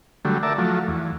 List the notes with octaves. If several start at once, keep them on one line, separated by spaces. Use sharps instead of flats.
D3 F#3 G3 A3
A#4 D5 E5 A5
F3 F#3 A3
E2